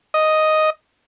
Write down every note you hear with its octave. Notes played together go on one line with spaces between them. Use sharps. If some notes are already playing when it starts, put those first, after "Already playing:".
D#5